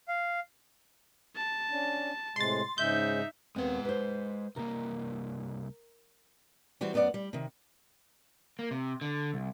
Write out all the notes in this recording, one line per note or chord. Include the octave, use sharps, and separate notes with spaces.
F5
A5
C#4 D4
A2 C3 G#3 C6 A6
G#2 C#3 G#3 D#4 E5 G6
D#2 G#3 B3 C4 F#5
B4 C5
C2 A#3 A#4
E3 G3 C4 F#4
F#2 B3 F4 D5 F#5
G3
C3 D#3
A#3
C3
D3
C2